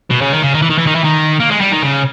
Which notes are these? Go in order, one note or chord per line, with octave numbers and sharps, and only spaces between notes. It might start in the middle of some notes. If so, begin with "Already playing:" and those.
B2
C#3
D#3
C#3
D#3
E3
D#3
E3
D#3
E3
D#3
A#3
G#3
G3
D#3
C#3